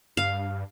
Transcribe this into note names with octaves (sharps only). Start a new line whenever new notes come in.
G2 F5